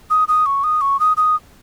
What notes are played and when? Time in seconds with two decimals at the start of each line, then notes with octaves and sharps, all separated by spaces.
0.10 D#6
0.28 D#6
0.46 C#6
0.64 D#6
0.81 C#6
1.00 D#6
1.17 D#6